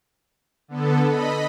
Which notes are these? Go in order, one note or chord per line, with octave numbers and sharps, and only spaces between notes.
D3 B3 A4
D#5 B5